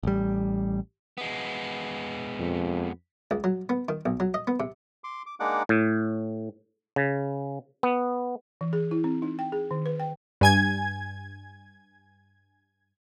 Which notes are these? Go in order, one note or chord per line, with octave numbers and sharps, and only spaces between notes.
A1 G3
G#3 B3
F2
C#2
F#3
B3
D#3
B1
F#3
D#5
B3
C3
C6 D6
D6
G#3 A#3 D4 D#4 F#5 D6
A2
C#3
B3
E3
G#4
E4
C4
D#4
G5
G#4
D#3
B4
G5
G2 G#5 G#6